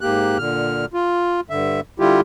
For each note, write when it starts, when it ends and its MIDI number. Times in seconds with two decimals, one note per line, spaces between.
0.01 0.38 44
0.01 0.38 58
0.01 0.38 67
0.01 0.38 90
0.38 0.85 46
0.38 0.85 50
0.38 0.85 89
0.94 1.41 65
1.50 1.80 43
1.50 1.80 50
1.50 1.80 76
1.99 2.21 50
1.99 2.21 55
1.99 2.21 64
1.99 2.21 65
1.99 2.21 67